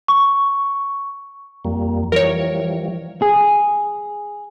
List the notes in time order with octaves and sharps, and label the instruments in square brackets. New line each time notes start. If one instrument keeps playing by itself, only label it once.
[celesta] C#6
[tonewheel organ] F2 G3 A#3
[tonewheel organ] E3 F3 G3 [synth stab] A#4 C#5
[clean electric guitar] G#4